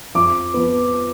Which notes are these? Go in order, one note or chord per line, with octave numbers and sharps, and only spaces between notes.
F2 D6
F3 B3